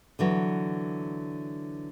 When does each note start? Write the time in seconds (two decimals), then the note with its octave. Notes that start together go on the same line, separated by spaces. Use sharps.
0.19 D3 E3 F#3